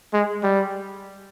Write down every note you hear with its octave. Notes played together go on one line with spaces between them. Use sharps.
G#3
G3